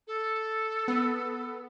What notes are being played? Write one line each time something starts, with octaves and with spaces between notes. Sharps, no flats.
A4
B3